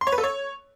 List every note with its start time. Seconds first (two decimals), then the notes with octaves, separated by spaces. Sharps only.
0.01 C6
0.07 C#5
0.12 B4
0.18 A4
0.24 C#5